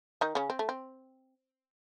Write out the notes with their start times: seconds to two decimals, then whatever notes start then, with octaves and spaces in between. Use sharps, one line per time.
0.21 D#3 D#4
0.35 C#3 C#4
0.50 C4
0.59 A3
0.69 C4